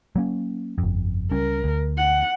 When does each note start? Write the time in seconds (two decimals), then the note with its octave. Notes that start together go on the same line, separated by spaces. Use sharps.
0.16 F#3 A#3 C#4
0.78 G1 F2
1.32 C#2 G3 C#4 A#4
1.64 D2
1.97 F#5